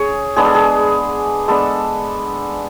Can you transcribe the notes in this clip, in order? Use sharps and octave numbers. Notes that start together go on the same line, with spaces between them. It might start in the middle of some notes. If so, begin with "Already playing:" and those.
Already playing: C#4 G#4 C#5
G#3 B3 D4 G#4
A4
G#4
G#3 B3 D4 A4